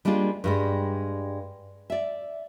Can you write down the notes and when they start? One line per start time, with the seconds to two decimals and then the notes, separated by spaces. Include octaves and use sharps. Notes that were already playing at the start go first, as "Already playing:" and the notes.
0.05 G3 G#3 A#3 D4 F4
0.44 G2 G3 G#3
1.90 D5 E5